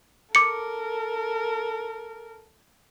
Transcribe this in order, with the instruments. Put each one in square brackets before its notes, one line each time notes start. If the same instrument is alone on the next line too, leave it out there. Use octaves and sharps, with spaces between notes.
[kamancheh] A4 A#4 [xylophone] D6 C#7